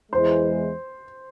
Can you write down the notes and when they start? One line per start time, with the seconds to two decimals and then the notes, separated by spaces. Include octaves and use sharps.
0.12 E2 E3 G#3 C5